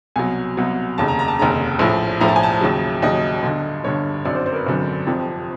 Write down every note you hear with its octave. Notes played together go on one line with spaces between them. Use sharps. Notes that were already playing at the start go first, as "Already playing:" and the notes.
C2 B2 F#3 G#5
C2 B2 F#3
F1 D#2 C#3 A5
A#5
A#5
A5
F1 D#2 C#3 A#5
A#1 A2 F3
A#1 A2 F3 A#5
A5
G#5
A5
D#2 C#3 F#3
D#2 C#3 F#3 D#5
G1 G2 D3
G1 G2 D3 C#5
G#1 F#2 D3 F#3 D5
C5
C5
A#4
B4
G#1 F#2 D3 F#3
F1 F2 C3 F3